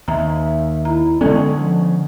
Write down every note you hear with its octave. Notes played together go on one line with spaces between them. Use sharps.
D#2 E5 A#5
E4 A#5
D3 G#3 B3 C#4 A4 D5 C#6
F3